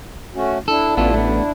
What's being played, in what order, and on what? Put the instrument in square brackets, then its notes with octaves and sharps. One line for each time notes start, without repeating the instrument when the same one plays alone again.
[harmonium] A3 C#4 F#4
[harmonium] D4 E4 [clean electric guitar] A4
[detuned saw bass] A1 [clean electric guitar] B3 F4 A4
[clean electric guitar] A3 B3